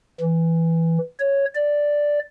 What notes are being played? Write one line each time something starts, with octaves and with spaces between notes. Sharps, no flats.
E3
C#5
D5